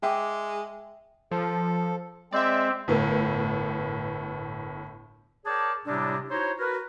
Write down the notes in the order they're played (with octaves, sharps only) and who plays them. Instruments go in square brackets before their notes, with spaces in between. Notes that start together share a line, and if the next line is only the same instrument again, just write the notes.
[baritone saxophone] G#3 [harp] E5 G5 D6
[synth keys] F3 [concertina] A4
[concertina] G#3 [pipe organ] C4 [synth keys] D5 E5
[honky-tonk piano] G1 A2 B3 A#4
[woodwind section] G#4 A#4 C#5 D5 G5 A5
A2 C3 G3 G#3 C4 D4
D#4 E4 F#4 C5 C#5
F#4 A#4 B4